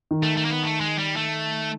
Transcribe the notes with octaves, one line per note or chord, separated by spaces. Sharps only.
D#3
A3
A3
A#3
B3
A3
G#3
G3
A3